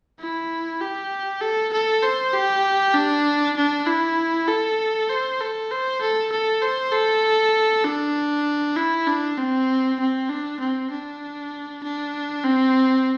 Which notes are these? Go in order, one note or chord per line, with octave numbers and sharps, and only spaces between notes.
E4
G4
A4
A4
C5
G4
D4
D4
E4
A4
C5
A4
C5
A4
A4
C5
A4
D4
E4
D4
C4
C4
D4
C4
D4
D4
C4